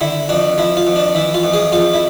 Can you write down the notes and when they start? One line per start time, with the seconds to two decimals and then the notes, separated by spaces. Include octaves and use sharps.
0.01 D3 E4
0.29 F2 D4
0.58 F3 E4
0.77 F4
0.87 F2
0.96 D4
1.15 E3 E4
1.34 F4
1.43 F2
1.53 G#4
1.72 F2 F4
1.94 E4